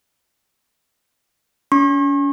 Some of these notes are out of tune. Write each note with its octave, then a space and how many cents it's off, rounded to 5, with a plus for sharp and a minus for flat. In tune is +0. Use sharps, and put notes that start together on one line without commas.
C#4 +40 C#6 -40